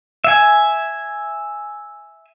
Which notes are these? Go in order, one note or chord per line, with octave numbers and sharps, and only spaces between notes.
E5 G#5